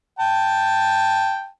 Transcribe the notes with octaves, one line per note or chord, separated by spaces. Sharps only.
G5 A5